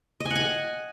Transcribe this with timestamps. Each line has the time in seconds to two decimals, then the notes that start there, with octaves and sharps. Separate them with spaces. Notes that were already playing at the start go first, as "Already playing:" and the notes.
0.20 D#5
0.25 G#5
0.30 F#5
0.36 G#5